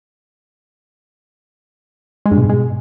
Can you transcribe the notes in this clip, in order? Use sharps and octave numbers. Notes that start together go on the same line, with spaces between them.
G#3
G2
B2
G#2
G#3